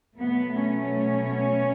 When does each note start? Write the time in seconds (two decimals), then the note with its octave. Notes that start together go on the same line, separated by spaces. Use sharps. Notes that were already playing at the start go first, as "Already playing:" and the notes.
0.17 B2 F#3 A3 B3
0.63 C#4